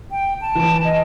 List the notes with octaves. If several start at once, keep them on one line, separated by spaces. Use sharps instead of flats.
G5
A5
E3 D7
D#5